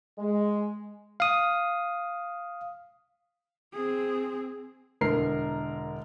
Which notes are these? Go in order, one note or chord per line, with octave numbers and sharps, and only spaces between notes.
G#3
F5 D#6
C4 G#4
E1 D3 A#4 C7